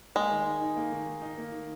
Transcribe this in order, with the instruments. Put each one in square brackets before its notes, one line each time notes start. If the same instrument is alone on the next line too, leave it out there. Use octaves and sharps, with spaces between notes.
[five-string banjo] G#3 [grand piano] A#3
[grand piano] D#3
D#3
D#4
A#3
D#3
D#3
D#4
A#3
D#3